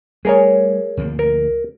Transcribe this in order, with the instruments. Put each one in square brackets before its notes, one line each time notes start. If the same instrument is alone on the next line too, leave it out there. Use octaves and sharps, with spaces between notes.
[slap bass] G3 A3 [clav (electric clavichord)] G#4 A#4 C#5
[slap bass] D2 F3 A#3
[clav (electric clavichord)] A#4